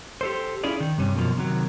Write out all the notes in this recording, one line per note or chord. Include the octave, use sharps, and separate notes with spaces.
G4 A4 C5
C#4 E4 F4 G#4 D5
D#3
G2 C3 C#4
F#2 B2 F3
C3 D#3 F#3